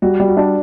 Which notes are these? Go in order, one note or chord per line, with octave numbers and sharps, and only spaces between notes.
G3 F#4
G3
F#4
D4